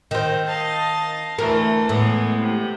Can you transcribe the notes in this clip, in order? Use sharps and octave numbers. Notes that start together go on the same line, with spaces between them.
D#3 C4
D#5 F5 A5
D2 E3 A3 A#4
A2 E3 G#3 B3
C3